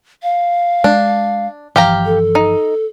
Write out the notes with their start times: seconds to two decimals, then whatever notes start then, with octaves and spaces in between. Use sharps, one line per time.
0.23 F5
0.84 G#3 D4
1.76 G1 E3 F3 G4 F5 A#5
2.06 A4
2.35 D#4